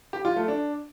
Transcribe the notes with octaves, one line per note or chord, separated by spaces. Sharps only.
G4
F4
A3
D4